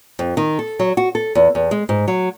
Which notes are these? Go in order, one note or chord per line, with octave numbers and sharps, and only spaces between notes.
F2
D#3
A4
F#3
F#4
A4
E2
E2
G#3
G#2
F#3